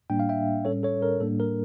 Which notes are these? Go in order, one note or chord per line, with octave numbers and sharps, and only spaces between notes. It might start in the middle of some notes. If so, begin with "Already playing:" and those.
A2 G3 A#3 D4 G5
F5
E5 G5
A2 G3 C#4 A4 C#5
A4 C#5
A#4
A2 G3 A#3 D4 A4
A#4